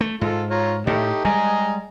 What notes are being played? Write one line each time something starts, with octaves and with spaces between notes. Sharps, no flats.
A3
G#2 F4 A4
F4 C#5 A#5
A2 A3 D#4 G4
G3 G#3 D#5 G#5 A#5